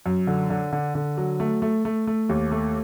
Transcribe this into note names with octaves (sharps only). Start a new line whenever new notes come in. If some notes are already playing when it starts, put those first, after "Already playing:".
F#2
D3
D3
D3
D3
F#3
A3
A3
A3
A3
D#2
A3